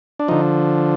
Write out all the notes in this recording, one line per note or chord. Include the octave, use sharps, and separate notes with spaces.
D4
D3 F3 D#4